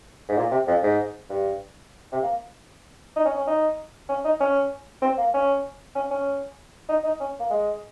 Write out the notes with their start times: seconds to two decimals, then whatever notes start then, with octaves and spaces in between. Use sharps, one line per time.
0.29 G#2
0.37 A#2
0.51 C3
0.67 F2
0.83 G#2
1.30 G2
2.12 C3
2.23 A#3
3.16 D#4
3.26 C#4
3.37 C#4
3.47 D#4
4.09 C#4
4.25 D#4
4.41 C#4
5.02 C4
5.18 A#3
5.34 C#4
5.96 C#4
6.11 C#4
6.89 D#4
7.04 D#4
7.20 C#4
7.40 A#3
7.50 G#3